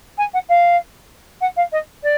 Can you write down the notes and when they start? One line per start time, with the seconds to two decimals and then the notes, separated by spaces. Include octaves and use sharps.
0.17 G#5
0.33 F#5
0.49 F5
1.41 F#5
1.56 F5
1.72 D#5
2.03 D5